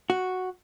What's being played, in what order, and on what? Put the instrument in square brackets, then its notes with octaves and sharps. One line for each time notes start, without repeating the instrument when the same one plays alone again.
[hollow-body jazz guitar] F#4